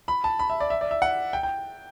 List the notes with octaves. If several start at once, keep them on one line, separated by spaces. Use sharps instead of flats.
B5
A5
B5
E5
D5
E5
D5
E5
F#5
G5
G5